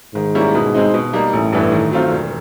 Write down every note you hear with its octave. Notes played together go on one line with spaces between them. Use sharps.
G#2 D#3
G3 A#3 C#4 E4
B2
G#3 C4 D#4
B2
G3 A#3 D#4
A1 A2
G2 E3 A3
D#3
F#3 A3 C4 F4
E1